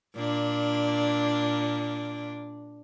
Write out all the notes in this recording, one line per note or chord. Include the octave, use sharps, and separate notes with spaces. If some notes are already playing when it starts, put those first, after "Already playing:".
A#2 D4